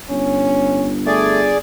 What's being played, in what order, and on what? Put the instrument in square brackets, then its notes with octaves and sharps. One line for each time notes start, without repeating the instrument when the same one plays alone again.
[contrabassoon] G1 [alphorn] C#4
[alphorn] A3 [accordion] G#4 D5